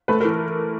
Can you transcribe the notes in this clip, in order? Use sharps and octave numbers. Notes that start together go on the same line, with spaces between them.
A3 B4
A#4
E3